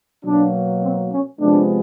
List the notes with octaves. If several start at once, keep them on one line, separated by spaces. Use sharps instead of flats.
B2 F#3 A#3 D4
C4
C#4
C3 F3 G#3 B3 D4